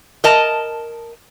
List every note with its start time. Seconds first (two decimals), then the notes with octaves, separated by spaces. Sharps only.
0.24 A#4 D#5 A5